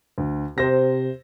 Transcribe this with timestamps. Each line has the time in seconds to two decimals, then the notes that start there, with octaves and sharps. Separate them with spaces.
0.18 D2
0.58 C3 C5 A#6